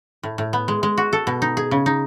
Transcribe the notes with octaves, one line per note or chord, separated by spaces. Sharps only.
A2
A2
B3
G#3
G#3
F#4
A4
B2
D#4
G#4
C#3
D#4